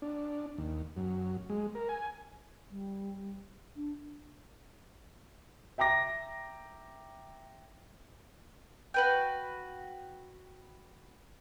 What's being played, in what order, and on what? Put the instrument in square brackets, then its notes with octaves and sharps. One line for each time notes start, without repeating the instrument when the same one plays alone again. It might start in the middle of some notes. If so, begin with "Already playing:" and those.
[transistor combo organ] D4
D#2
F#2
G#3
A#4
G#5
[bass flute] G3
D4
[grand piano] E5 G5 A#5 D6 A#6
[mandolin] F#4 B4 G5